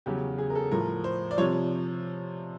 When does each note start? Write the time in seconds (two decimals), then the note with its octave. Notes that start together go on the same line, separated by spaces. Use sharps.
0.06 E2 C#3 F#3 G4
0.38 G#4
0.50 A#4
0.55 A4
0.71 A2 F3 A#4
1.04 C5
1.31 D5
1.38 C3 F3 C#5